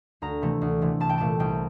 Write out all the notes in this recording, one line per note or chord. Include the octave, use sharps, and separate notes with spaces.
D2 A#5
C3 E3 A3
D2
C3 E3 A3
C2 A5
G5
A#2 A3 A5
C2 G5